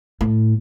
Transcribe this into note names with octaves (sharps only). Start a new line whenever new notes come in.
A2